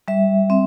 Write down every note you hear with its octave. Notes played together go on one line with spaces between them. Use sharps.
G3 E5
C4 E5